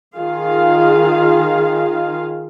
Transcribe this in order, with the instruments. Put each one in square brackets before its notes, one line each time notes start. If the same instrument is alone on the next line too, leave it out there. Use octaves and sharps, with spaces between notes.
[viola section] D#3 F4 G#4 F5